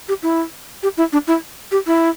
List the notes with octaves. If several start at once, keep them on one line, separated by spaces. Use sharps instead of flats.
G4
E4
G4
E4
D4
E4
G4
E4